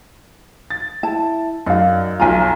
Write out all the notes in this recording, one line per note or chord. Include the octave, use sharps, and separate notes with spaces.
A6
E4 A5
F#2 D#4 D5 F5
B1 F3 F4 G#5 A#5